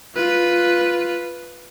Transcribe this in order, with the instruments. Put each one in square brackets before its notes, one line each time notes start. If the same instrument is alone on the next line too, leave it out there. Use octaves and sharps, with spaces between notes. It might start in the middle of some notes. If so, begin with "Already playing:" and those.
[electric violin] F4 B4